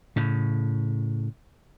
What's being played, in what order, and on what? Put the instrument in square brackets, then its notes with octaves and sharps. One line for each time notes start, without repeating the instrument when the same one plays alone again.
[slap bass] A2 C#3